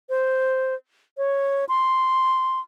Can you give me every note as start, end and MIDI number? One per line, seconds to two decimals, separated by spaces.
0.09 0.75 72
1.18 1.65 73
1.69 2.60 84